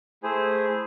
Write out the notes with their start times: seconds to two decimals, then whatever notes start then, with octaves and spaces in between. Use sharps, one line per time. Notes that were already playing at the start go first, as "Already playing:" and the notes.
0.23 A3 E4 G#4 C5 G#5